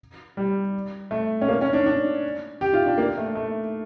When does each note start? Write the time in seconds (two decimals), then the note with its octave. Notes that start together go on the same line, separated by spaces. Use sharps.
0.37 G3
1.11 A3
1.41 C#4
1.48 A#3
1.61 C#4
1.73 D4
1.86 D4
2.61 G4
2.73 F4
2.86 D4
2.98 A#3
3.17 A3
3.35 A3